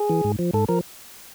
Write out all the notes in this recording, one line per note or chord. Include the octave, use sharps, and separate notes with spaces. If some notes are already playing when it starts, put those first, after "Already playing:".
Already playing: G#4
E3
G#2
F3
G#2 A4
F3 A#4